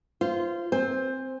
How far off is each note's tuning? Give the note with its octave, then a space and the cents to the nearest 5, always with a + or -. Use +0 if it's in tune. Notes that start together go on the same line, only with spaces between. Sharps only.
F4 -20 C5 +0
C4 +0 C5 +10 G#5 -30